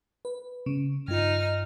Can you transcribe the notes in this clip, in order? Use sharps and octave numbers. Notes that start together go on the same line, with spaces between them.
B4
C#3
G2 D#4 F4 F6